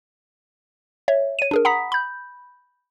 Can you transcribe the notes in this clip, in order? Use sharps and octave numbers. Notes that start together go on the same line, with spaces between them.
C#5 E5
C#5 D#7
D4 G#4 A#4
F#5 A#5 B5 D#6 B6
B5 G6